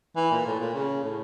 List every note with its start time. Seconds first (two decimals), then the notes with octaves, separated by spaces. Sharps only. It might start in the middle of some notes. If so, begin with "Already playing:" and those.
0.16 E3
0.32 A#2
0.46 A2
0.60 A#2
0.74 C#3
1.04 A2